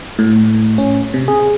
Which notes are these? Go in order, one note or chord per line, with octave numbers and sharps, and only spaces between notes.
A2
C#4
C3
G#4